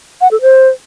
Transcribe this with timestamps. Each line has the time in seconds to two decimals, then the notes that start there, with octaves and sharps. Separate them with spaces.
0.21 F#5
0.31 A4
0.42 C5